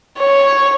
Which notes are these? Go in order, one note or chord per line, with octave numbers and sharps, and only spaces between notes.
C#5